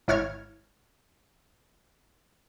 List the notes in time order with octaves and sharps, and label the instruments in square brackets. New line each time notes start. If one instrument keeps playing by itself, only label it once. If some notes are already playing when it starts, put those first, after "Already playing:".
[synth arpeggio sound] G#1 E4 C#5 F6 G#6